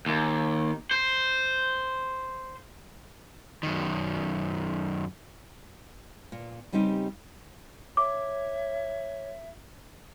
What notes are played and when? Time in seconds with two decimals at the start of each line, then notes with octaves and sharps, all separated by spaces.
0.06 D#2
0.91 C5
3.63 F#2 D#3
6.32 A#2
6.72 C#3 G3 C4 D#4 G4
7.97 C#5 E5 D6